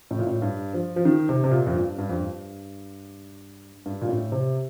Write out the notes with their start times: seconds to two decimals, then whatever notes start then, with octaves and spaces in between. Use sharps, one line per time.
0.11 A2
0.19 A#2
0.27 A2
0.42 G2
0.74 F3
0.96 F3
1.05 D#3
1.29 C3
1.44 C3
1.51 A#2
1.67 F2
1.74 G2
1.98 G2
2.09 F2
2.20 G2
3.86 G2
4.01 A#2
4.09 A2
4.32 C3